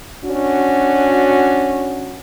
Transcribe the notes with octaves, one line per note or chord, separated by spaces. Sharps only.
C#4 D4 F#4